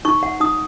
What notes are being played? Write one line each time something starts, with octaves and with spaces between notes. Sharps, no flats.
D#4 C#6
F#5
D#4 D#6